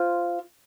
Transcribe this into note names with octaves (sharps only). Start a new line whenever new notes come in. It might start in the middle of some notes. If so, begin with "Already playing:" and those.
Already playing: F4 C5